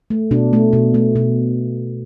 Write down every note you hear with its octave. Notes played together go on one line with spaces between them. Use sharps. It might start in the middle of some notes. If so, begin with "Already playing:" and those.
A3
B2 D4
A3
B2
A3
B2